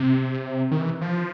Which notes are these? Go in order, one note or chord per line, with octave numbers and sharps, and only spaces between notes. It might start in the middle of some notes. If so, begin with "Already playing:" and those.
Already playing: C3
D#3
E3
F3